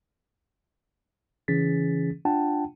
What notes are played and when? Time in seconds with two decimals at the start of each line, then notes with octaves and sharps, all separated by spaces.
1.48 C#3 E3 C#4 G#4 A6 B6
2.25 D4 F4 F#5 G5 A5